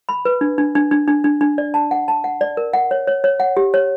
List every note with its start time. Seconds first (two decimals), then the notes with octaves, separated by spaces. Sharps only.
0.09 B5
0.25 B4
0.41 D4
0.58 D4
0.75 D4
0.91 D4
1.08 D4
1.24 D4
1.41 D4
1.58 D5
1.74 A5
1.91 F#5
2.08 A5
2.24 F#5
2.41 D5
2.57 A#4
2.74 F#5
2.91 C#5
3.08 C#5
3.24 C#5
3.40 F#5
3.57 G4
3.74 C#5